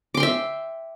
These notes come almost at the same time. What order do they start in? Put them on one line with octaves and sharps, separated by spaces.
D6 C6 G5 E5